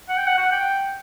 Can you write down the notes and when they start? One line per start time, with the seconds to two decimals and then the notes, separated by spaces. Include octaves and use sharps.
0.09 F#5
0.17 G5
0.27 F#5
0.38 F#5
0.52 G5